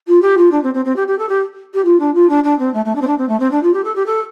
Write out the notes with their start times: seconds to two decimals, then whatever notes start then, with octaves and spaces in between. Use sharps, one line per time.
0.08 F4
0.22 G4
0.37 F4
0.51 D4
0.63 C4
0.74 C4
0.85 C4
0.96 G4
1.07 G4
1.18 A4
1.29 G4
1.74 G4
1.85 F4
1.99 D4
2.14 F4
2.29 D4
2.44 D4
2.59 C4
2.74 A3
2.85 A3
2.95 D4
3.01 C4
3.07 D4
3.18 C4
3.28 A3
3.39 C4
3.51 D4
3.63 F4
3.73 G4
3.84 A4
3.95 G4
4.06 A4